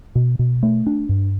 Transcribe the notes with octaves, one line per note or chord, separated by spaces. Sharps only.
B2
B2
A3
D4
G2